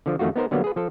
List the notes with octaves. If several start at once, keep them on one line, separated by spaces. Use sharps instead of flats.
D3 F3
F2 D#3 A3 F4 F#4
B3 D#4 A#4 C5
D3 F#3 G3 A#3 B3
G#4 B4
F3 A4